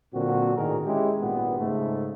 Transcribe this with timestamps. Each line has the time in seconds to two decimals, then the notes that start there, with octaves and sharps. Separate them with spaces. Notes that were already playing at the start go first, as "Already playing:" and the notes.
0.13 A#2 D3 F#3 C4 F#4
0.56 A2 D#3 D4 G#4 A#4
0.86 G#3 C#4 E4 G4
1.19 G#1 A#2 B3
1.60 G#2 C#3 A3